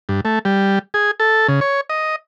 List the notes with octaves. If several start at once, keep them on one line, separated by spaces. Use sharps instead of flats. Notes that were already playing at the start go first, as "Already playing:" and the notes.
G2
A3
G3
G#4
A4
C#3
C#5
D#5